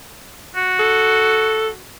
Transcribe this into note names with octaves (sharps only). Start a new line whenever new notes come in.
F#4
A4